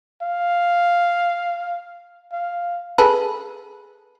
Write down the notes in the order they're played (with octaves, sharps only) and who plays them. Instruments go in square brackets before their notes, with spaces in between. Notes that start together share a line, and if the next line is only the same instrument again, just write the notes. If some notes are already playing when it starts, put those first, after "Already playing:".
[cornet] F5
F5
[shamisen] G#4 A4 B4